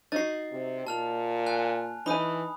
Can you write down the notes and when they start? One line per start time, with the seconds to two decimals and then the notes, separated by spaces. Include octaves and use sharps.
0.12 D#4 F#4 A6 C7
0.51 C3
0.87 A#2 A5 F6 F7
1.47 G#5 F#6
2.06 E3 D#4 G#5 B5 D#6